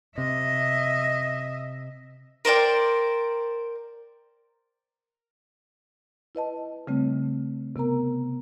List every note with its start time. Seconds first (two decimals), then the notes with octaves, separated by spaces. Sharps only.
0.18 C3 D#5 E5
2.45 A#4 C5 D5 G5
6.35 E4 B4 D#5 A5
6.87 C#3 G3 A3 C4
7.76 C3 B3 A#4 A#5